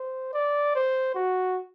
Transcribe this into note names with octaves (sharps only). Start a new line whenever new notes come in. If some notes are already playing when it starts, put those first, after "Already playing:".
Already playing: C5
D5
C5
F#4